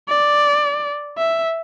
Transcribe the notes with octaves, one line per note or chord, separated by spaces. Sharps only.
D5
E5